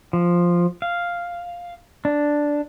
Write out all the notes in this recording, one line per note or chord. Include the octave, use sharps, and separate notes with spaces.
F3
F5
D4